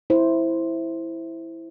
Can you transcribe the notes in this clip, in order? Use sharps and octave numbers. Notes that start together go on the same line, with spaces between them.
E4 C5